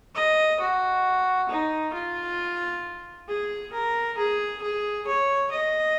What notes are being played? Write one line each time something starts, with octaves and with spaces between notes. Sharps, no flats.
D#5
F#4
D#4
F4
G#4
A#4
G#4
G#4
C#5
D#5